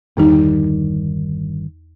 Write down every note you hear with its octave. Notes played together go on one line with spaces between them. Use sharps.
G1 E2 D#3 G3 D#4